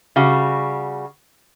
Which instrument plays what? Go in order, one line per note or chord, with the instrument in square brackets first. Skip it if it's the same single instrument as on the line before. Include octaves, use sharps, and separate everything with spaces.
[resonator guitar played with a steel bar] C#3 G3 F#4